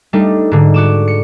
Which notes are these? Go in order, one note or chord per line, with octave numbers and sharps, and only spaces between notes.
G3 A3 D4 D#4
G#2 D3
F#4 D6 E7
C#7